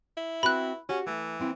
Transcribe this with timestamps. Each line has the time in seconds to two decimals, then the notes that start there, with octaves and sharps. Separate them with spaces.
0.17 E4
0.43 C4 F#4 B4 B5 F#6
0.89 C#4 F#4 G4 F#5
1.07 E3 A3
1.40 A#3 C4 E4